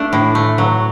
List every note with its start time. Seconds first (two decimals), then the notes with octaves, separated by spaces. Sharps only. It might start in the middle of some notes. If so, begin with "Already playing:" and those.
Already playing: A3 D4
0.13 A2
0.35 A3
0.58 F#3